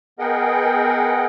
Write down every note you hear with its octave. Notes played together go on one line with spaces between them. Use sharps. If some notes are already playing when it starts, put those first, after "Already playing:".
B3 G#4 A#4 D#5 F#5 G5